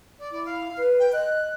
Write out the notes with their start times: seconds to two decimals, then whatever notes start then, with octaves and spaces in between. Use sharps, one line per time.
0.19 D5
0.32 E4 D5
0.46 F5
0.77 B4
1.00 G5
1.13 D#5 F#6